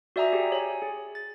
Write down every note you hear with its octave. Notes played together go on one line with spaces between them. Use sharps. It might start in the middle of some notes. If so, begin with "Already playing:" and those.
F#4 D5 E5 G#5 A#5 D#6
G4 G#4 G5
C#5 G#5
G#4
A6